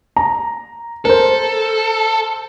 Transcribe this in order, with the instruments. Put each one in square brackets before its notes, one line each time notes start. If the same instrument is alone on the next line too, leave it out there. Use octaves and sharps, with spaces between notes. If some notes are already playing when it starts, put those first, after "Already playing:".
[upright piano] A#5
[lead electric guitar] A4 [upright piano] A#4 C5